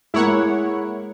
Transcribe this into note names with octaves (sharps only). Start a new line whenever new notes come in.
G#3 A#3 E4 C#5 F#5